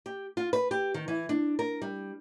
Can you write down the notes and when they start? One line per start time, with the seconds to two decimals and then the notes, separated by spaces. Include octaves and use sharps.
0.06 G4
0.37 F4
0.53 B4
0.71 G4
0.94 D#3
1.08 E3
1.29 D4
1.59 A#4
1.82 G3